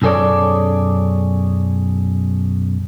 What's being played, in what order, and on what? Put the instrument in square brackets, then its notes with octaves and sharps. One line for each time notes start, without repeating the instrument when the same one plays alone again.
[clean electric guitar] B1 F#2 G#4 A4 C#5 D5